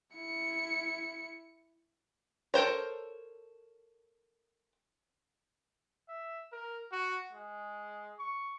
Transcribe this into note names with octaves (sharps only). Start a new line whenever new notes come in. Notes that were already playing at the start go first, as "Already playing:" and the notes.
E4 C#7
A4 A#4 C5 C#5
E5
A#4
F#4
G#3
C#6